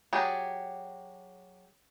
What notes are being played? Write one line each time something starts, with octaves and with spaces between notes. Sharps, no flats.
F#3 D4 G4 G#4